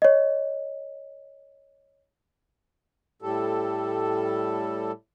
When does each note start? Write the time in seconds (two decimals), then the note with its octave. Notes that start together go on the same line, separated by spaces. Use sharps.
0.02 C#5 D#5
3.22 A2 G3 A4